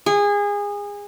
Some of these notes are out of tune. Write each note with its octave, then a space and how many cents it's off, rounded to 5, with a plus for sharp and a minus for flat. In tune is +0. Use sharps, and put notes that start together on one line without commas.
G#4 -25